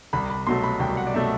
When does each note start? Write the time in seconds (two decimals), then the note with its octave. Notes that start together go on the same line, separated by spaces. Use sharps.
0.13 C2 B5
0.30 B5
0.47 B2 F#3 A3 C6
0.63 B5
0.80 C2 G5
0.97 F#5
1.07 D5
1.14 B2 F#3 A3 E5